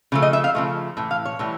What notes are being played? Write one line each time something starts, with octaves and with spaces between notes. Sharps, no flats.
C#3 F3 A3
D#5
E5
F5
C#3 F3 A3
A2 E3
F5
C#5
A2 E3 G3